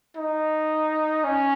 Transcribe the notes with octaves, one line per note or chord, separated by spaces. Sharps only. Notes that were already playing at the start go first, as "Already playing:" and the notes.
D#4
C#4